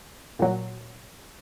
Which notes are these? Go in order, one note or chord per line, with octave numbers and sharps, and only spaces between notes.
A#2 F#3